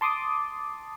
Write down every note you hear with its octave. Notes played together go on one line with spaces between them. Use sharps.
A5 C6 D6 D#6